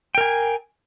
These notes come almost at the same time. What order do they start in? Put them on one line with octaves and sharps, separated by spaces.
G5 A#4 G#5